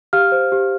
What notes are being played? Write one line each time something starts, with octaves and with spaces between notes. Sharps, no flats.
G4 F5 F6
C5
G4